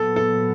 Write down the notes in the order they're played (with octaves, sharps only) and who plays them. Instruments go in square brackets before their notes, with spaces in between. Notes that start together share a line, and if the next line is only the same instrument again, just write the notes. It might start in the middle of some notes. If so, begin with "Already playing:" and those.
Already playing: [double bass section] A#2 F#3 B3 [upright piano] A4
[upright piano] A4